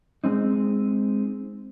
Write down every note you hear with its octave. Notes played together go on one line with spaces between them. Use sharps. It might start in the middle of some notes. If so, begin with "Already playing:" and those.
G#3 C4 D#4